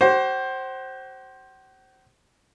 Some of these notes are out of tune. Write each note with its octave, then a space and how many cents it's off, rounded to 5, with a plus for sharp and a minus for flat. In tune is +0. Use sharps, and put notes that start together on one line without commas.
F#4 +45 C5 +15